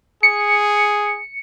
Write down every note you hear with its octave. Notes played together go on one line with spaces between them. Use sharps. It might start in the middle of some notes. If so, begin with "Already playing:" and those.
G#4 C#7